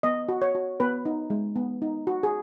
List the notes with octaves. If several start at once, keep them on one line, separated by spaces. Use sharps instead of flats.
B3 D#5
F#4
C#5
F#4
B3 B4
D#4
G#3
B3
D#4
F#4
G#4